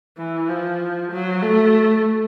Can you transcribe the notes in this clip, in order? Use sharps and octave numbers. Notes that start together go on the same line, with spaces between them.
E3
F3
F#3
A3